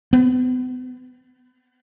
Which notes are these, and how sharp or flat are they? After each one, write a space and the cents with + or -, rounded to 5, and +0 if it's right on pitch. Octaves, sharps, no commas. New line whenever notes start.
B3 +35